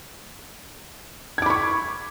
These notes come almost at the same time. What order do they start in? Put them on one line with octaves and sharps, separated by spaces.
G#6 D6 B5 C#6